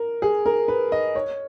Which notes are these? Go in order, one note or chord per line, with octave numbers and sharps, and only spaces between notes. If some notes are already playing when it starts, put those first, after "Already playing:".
Already playing: A#4
G#4
A#4
B4
D#5
C#5